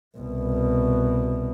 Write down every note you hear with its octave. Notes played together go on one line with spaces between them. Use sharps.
C2 B2